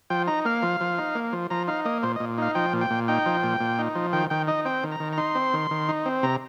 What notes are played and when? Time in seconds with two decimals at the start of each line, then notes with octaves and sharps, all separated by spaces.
0.10 F3 G5
0.27 D#4 A#5
0.45 A#3 F5
0.63 F3
0.81 F3
0.98 D#4
1.15 A#3
1.33 F3
1.50 F3 A#5
1.68 D#4 F5
1.85 A#3 D#5
2.03 A#2 C5
2.16 D#5
2.20 A#2
2.38 D#4 F5
2.55 F3 G5
2.73 A#2
2.81 G5
2.90 A#2
3.08 D#4 G5
3.26 F3
3.43 A#2
3.60 A#2
3.79 D#4
3.95 F3
4.13 D#3 G5
4.30 D#3 G5
4.47 D#4 D#5
4.65 C4 G5
4.84 D#3
4.92 A#5
5.00 D#3
5.13 A#5
5.18 D#4 C6
5.35 C4
5.53 D#3
5.71 D#3
5.89 D#4
6.06 C4
6.23 C3 A#5